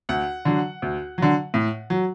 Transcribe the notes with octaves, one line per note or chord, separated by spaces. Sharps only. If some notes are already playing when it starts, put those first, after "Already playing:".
D2 F#5
D3 F#3
D2
D3 F#3
A2
F#3